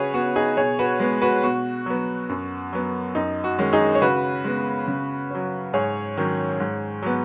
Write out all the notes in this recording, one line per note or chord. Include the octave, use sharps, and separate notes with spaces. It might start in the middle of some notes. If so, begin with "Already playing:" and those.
Already playing: C#3 F#4 G#4 B4 C#5
B3 F#4
D#4 G#4
B2 G#4 C#5
F#4 B4
G#3 B3
F#4 B4
B2 F#4
F#3 B3
F#2
F#3 B3
F#2 D#4
F#4
D#3 G#3 C#4
D#4 G#4
C#5
C#3 F#4 B4
G#3 B3
C#3
F#3 C#4
G#2 G#4 C#5
D#3 F#3 C#4
G#2
F#3 B3